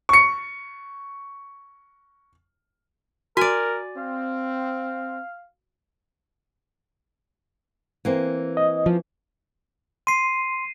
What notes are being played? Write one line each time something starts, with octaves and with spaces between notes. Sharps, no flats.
C#6 C#7
F#4 A#4 D5 G#5
C4 F5
E3 A#3 C4
D#5
F3
C6 C7 D#7